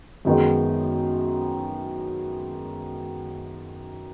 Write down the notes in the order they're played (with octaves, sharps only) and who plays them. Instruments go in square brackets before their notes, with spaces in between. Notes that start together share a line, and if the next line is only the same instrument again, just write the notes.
[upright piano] F#2 D#3 G#3 B3 D#4